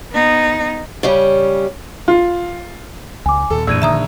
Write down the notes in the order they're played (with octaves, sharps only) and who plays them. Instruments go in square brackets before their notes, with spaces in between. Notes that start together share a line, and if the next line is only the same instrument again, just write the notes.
[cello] B3 D#4
[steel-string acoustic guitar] C#3 G3 C#4
[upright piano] F4
[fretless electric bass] C#2 [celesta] G#5 D6
[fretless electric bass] D#2 A#2 [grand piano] A4
[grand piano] A#1 [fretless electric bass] F#2 E3 [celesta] E6 G#6 D#7
[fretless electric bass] D3 D#3 [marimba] E5 A#5 D#6